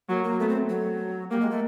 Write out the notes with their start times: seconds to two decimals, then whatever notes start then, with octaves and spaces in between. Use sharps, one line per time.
0.09 F#3 A#3
0.24 A#3
0.39 A3 B3
0.49 C4
0.69 F#3
1.31 G3 A#3
1.41 G#3
1.51 A3